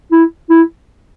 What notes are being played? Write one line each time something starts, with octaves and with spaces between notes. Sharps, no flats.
E4
E4